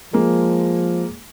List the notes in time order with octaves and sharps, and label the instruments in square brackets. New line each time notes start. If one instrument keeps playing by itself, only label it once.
[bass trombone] F3 [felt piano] G#3 A#3